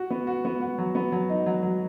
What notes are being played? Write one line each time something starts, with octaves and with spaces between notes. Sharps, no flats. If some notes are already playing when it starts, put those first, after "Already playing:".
Already playing: F#4
B3
F#4
B3
F#4
F#3
B3
F#3
D#4
F#3
F#3